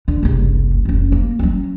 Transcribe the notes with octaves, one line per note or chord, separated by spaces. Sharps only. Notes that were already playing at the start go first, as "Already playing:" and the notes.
D3
F#1 C2
F1 C#4
A#3
F#3 C#4